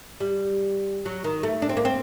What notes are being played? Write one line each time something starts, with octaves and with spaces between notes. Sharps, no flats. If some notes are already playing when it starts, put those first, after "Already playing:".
G3
F#3
D#3
A3
D4
C4
A#3
C4